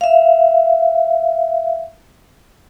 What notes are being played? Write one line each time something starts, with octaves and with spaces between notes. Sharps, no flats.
E5 F5